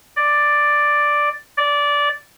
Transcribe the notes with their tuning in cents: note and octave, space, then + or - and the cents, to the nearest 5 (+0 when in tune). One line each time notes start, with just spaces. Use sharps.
D5 +5
D5 -15